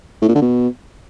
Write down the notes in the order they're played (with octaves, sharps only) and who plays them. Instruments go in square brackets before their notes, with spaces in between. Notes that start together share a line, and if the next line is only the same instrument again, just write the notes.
[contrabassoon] A2
A#2
D3
B2